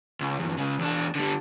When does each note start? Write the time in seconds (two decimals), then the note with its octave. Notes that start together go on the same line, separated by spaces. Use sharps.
0.20 C#2
0.39 E2 G2
0.58 C#2 C#3
0.79 E2 D4
1.15 D3 G3